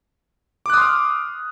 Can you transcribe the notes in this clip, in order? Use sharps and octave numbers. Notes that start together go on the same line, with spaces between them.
C6 D6 D#6 F6 F#6